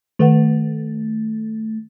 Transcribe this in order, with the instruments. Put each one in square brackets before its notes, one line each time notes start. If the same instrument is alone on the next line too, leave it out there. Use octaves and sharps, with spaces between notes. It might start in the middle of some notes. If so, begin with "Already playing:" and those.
[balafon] D#3 B4 F#5 [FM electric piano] A3